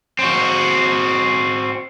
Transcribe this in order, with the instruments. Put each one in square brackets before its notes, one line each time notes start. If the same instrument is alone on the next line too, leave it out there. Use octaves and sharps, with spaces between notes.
[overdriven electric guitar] C4 F#4